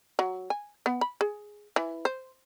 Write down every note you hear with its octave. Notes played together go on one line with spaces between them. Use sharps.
F#3
G#5
B3
B5
G#4
E3
C5